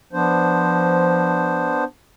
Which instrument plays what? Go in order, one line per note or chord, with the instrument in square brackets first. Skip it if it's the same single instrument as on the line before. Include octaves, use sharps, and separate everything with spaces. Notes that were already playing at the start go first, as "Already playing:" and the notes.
[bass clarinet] F3 [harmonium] B3 D4 C5